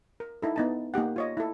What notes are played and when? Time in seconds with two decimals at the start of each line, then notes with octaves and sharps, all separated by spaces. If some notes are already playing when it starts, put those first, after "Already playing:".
0.20 A#4
0.42 D#4 E4 A4
0.56 B3 D#4 A5
0.94 A#3 D#4 G4 F#5
1.16 F4 C#5 D#5
1.37 E4 A4